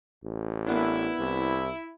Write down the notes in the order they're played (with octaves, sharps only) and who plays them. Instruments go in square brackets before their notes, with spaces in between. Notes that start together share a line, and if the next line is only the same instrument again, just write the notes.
[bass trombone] A1
[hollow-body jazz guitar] A#3 B3 D4 [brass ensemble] E4
[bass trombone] C2